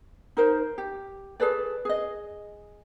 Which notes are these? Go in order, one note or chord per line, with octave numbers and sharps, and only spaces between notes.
D#4 A#4 C5
G4
G#4 A4 B4 D5
G#4 D#5